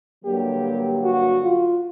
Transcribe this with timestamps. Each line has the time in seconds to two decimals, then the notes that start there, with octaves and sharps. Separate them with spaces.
0.24 G2 D3 F#3 A#3 G4
1.02 F#4
1.42 F4